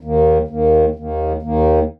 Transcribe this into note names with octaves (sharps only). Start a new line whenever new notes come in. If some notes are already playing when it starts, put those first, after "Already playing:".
D#2 D#3 A#3
D#2 D#3 A#3
D#2 D#3 A#3
D#2 D#3 A#3